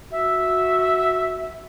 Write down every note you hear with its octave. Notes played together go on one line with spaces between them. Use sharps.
F#4 E5